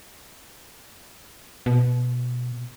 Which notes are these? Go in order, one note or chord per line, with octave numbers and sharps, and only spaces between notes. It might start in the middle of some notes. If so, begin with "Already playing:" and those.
B2